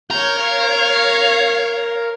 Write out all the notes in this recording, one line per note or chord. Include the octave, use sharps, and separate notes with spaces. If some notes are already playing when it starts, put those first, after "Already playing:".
A#4 C#5 G6
C#5 F5